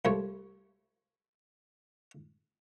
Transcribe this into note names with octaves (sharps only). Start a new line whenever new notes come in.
C2 F3 A3 C#5